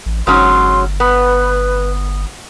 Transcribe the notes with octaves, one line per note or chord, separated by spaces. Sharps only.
A1
G1 G#2 F#3 C#4 C6
B3 B4